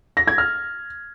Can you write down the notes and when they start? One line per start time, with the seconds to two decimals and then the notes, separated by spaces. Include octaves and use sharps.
0.17 A#6
0.27 G#6
0.38 F6